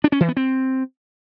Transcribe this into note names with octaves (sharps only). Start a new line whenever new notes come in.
D4
C#4
E3
B3
C4